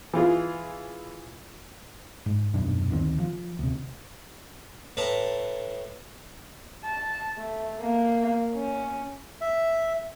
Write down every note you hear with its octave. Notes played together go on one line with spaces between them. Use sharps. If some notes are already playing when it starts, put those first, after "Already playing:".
E3 F4 G#4
G#2
D#1 B1 F#2 D4
D2 D#3 C4
F3
D2 C3
A2 B4 A5 A#5
A5
A3
A#3
C#4
E5